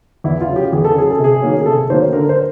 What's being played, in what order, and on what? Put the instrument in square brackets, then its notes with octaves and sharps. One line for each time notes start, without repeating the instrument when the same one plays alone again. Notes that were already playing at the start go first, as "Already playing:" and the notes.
[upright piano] E2 E4
F4
C#3 F#3
G4
E2 G#4
A4
C#3 F#3 G#4
A4
C3 G#4
D#3 F#3 A#3 C#4
G#4
C3 A4
D#3 F#3 A#3 C#4 C5
D3 A#4
C5